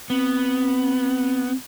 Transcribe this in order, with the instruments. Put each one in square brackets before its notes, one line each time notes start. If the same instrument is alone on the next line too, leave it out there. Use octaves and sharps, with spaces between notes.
[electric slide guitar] B3 [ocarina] C4
[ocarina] C4